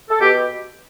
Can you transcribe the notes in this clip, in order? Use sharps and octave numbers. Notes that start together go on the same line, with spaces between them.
A4
B2 G4